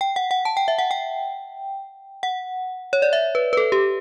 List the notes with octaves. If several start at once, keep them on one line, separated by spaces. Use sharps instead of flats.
G5
F#5
F#5
A5
G5
E5
F#5
G5
F#5
C#5
D5
E5
B4
B4
A4
G4